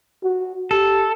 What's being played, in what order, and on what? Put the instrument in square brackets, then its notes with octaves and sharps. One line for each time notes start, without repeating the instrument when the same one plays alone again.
[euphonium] F#4
[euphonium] G4 [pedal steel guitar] A4